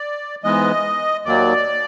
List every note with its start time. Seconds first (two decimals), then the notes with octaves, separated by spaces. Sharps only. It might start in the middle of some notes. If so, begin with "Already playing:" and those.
Already playing: D5
0.44 G#2 E3 G#3 B3 D#5
1.25 D#2 D#3 F#3 A#3 D5